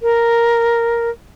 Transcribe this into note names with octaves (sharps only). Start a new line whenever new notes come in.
A#4